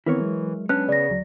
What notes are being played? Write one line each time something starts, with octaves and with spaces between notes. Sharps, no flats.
D#3 E3 B3 C4 E4 A#4 C#5
F#3 G#3
B3 C#4 D4 F#6
C#3 D5 A#6
D2 F#3